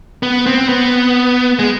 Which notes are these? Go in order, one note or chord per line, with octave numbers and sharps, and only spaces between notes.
B3
C4
B3
G#3